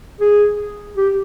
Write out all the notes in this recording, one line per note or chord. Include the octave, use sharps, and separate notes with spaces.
G#4
G4